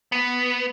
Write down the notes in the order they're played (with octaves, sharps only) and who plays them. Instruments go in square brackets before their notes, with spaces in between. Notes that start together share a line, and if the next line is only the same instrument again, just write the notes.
[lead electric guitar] B3